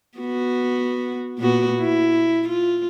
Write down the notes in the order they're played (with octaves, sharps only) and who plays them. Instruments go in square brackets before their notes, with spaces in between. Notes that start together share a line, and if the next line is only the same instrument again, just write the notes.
[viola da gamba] B3 F#4
A#2 B3 F#4
E4
F4